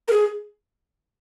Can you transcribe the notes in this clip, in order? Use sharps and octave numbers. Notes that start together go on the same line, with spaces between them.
A#4
G#4